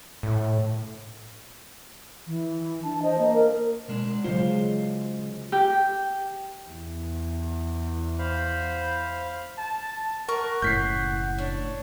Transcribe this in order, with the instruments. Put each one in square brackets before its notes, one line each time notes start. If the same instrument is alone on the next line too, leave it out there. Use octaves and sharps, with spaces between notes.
[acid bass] A2
[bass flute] E3
[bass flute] D4 [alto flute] A5
[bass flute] C5 [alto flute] D#5
[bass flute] A#3
[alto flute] A#4
[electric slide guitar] B2 G#3 D4
[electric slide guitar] C#3 C5 [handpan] F#3 G#3 F4
[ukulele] G4
[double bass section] E2
[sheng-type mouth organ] C5 F5 B5
[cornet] A5
[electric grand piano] A#4 [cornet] F#5 [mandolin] C#6
[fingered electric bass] F#1 A2 [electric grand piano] G6 B6 C7
[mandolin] D4 [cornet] C#5